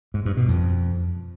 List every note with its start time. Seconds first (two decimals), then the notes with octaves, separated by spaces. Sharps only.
0.14 G#2
0.26 G2
0.37 B2
0.48 F2